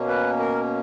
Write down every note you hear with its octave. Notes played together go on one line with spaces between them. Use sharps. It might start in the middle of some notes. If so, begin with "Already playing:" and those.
Already playing: B2 A#3 C#4
B4
A#4